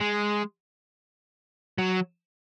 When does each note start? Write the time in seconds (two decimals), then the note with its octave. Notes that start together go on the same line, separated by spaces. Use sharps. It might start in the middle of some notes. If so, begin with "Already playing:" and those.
0.01 G#3
1.78 F#3